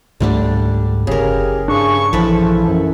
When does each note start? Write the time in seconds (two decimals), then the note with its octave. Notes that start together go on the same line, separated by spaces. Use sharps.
0.20 C#2 G#2 D3 G3 A3 D4
1.07 F#1 C#3 G4 G#4 A#4
1.68 G2 D4 G#4 C#6
2.13 A#1 E3 F3 A4 B4
2.66 F#2